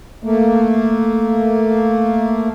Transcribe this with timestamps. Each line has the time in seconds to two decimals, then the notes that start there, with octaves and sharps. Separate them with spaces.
0.24 A3 A#3